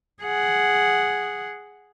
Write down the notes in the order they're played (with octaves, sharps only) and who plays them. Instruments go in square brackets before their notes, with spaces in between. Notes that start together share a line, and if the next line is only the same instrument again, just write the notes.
[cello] G#4 F#5